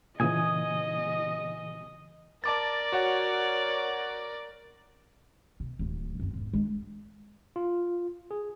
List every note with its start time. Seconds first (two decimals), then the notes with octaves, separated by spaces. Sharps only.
0.20 A#2 C#3 E3 D#5 G#5 D#6
2.44 A#4 D5 A5 D6 A6
2.92 F#4 C#5 F#5
5.60 B2
5.79 D1 D#2
6.19 F#2 C4
6.33 E2 G#2
6.53 G#3 D4
7.56 F4
8.31 G#4